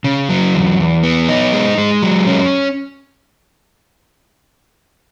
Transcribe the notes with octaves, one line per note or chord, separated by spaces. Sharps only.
C#3
F#3
E2
E2
B3
D#4
G#3
G#3
F#3
C#4